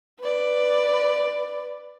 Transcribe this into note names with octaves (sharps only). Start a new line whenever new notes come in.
B4 D5